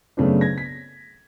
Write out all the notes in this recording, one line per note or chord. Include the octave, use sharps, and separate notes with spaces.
F#2 C#3 A3 B3 C4 D4
G#6 A#6
B6